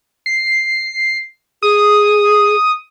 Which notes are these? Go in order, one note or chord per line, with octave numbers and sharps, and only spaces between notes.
C7
G#4 D#6